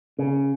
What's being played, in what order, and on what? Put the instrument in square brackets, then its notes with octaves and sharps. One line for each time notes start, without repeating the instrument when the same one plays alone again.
[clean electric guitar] C#3